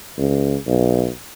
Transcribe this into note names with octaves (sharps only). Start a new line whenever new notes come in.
C#2
B1